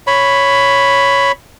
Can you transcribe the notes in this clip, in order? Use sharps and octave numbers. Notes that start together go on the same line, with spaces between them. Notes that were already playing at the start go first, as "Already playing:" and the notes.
C#5 B5